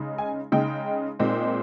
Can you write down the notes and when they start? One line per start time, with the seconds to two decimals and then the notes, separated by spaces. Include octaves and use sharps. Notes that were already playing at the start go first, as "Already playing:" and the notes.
Already playing: C#3 G#3 D#4
0.18 G#5
0.52 C#3 G#3 D#4 G5
1.19 A#2 G#3 C4 D#4